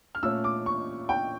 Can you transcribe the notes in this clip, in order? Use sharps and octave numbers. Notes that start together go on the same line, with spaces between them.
F6
A#2 A3 C#4 E6
D6
C#6
G5